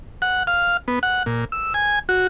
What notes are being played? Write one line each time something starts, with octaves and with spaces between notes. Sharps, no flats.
F#5
F5
B3
F#5
A#2
E6
G#5
F#4